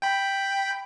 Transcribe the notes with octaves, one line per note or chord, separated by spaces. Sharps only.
G5 B5